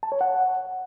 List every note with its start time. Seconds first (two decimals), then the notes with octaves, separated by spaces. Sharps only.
0.03 A5
0.12 C#5
0.21 F#5